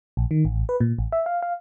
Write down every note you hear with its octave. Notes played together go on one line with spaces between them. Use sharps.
A#1
D#3
A1
B4
A#2
A1
E5
F5
F5